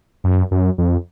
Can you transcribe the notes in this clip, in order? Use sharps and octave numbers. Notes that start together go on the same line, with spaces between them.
F#2
F#2
F2